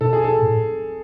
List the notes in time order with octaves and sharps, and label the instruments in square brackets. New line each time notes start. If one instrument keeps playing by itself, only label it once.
[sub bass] B2 [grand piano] A4
[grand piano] G#4
A4
[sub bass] A2